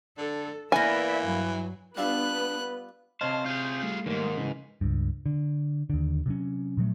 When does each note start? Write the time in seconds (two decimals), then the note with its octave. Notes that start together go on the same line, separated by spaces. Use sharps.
0.18 D3 A4
0.72 E3 A#3 B3 D5 E5 G#5
1.24 G2 F#3
1.97 G3 B3 D4 F4 B4 E5 F#6
3.21 C3 C5 C#5 D#5 F5 A5
3.46 F4 G#4 G6
3.83 G3 A3
4.06 E2 G#2 D#3 A#3
4.37 C#3 E3
4.81 C#2 G2
5.26 D3
5.90 D#2 D3
6.26 C3 F#3 C#4
6.77 A#2 F3 F#3 A3